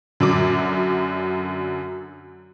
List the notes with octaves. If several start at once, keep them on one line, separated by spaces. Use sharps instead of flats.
F#2 D3 F#3 D6